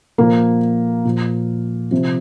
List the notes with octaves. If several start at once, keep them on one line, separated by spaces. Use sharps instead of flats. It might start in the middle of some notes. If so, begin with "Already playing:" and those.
A#2 F3 A#3 A#4
A#2 F3
C3 F3